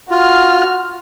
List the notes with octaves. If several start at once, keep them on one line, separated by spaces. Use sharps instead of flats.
F4 F#4 F6